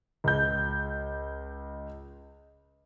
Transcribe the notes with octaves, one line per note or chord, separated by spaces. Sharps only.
C#2 G6